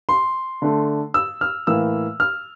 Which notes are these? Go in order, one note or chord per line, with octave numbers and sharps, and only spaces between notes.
C6
D3 A3
E6
F6
A2 E3 A#3 E6
F6